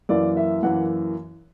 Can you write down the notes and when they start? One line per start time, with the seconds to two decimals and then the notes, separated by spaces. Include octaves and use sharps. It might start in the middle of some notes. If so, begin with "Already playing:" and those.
0.09 F#2 E3 A#3 D5
0.37 E5
0.63 F#2 E3 A#3 F#5